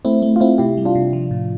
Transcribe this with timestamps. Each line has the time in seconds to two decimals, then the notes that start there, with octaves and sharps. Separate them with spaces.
0.05 A3 C4 E4
0.22 A3
0.36 F4
0.40 A3 C4 E4
0.58 C3 E4 G4
0.77 G3
0.85 D4 F4
0.95 C3
1.13 F3
1.31 A2